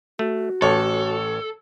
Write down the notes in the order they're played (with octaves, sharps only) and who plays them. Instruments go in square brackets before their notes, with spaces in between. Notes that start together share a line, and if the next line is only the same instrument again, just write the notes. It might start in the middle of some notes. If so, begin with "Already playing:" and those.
[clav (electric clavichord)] A3 [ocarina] F#4
[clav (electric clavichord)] A1 [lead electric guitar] A4 [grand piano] C#5